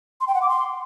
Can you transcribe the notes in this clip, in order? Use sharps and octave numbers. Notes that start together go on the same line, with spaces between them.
C6
G5
F#5
D6
C6